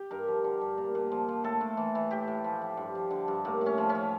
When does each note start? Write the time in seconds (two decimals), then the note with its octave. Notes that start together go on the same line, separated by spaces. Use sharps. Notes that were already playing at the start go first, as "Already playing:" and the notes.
Already playing: G4
0.11 G2 A#4
0.28 F3
0.44 D3
0.61 G2
0.78 A#2
0.95 A#2
1.12 F3
1.28 F3
1.44 A2 A4
1.61 A2
1.77 E3
1.95 E3
2.11 A2 G4
2.27 A2
2.44 F3
2.62 F3
2.77 G2
2.95 F3
3.11 D3
3.28 G2
3.45 A2 A#3
3.61 A2
3.66 C#4
3.78 F3
3.89 C#4
3.95 F3